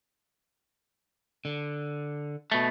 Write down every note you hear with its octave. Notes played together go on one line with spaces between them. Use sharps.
D3
B2 A3